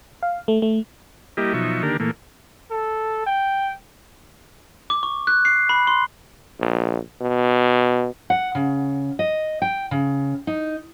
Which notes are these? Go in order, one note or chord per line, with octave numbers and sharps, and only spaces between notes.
F5
A3
A3
G3 A#3 E4 G4 D#5
B2 F3 F#3 D#4 E5 C#6
D3 D#3 A#3 D4 G4 A#4
A#2 E3 A3 A#3
A4
G5
D6
C#6
F#6
C7
B5
C6
A#1
B2
F#5
C#3
D#5
G5
C#3
D#4